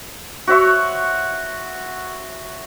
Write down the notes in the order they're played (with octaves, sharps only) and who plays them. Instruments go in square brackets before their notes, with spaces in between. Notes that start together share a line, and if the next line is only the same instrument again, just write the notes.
[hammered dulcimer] F#4 C#5 E5 C6